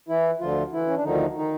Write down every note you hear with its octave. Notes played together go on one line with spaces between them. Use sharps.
E3 E4
D2 D3 F3 F4
E3 E4
C#4
D4
D2 D3 D#3 F3 D#4
D#3 D#4